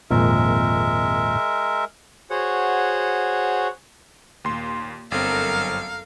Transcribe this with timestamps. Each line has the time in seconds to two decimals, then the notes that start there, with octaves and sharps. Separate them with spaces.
0.11 G#1 F2 A#2 G#3 A#4 E5
2.30 F#4 G#4 C5 C#5 F#5
4.45 D#2 A#2 C6
5.12 G1 F#2 C4 A4 A#4 F5